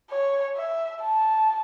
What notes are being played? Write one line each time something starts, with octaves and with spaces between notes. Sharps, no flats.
C#5
E5
A5